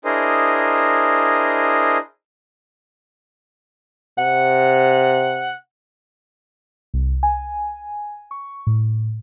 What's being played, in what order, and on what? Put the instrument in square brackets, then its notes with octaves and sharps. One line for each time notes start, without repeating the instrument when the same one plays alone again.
[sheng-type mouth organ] D4 E4 G#4 A#4 C5 D#5
[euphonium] C3 [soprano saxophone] F#5
[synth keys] C2
G#5
C#6
A2